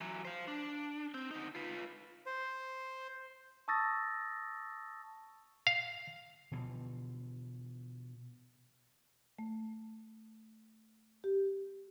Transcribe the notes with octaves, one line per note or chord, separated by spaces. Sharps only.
E3 F#3
C5 F5
D4
C4
D3 D#4
F4 B4
C5
A5 C#6 D#6 E6 A6 A#6
F5
B2 D3 E3 F3
A3
G4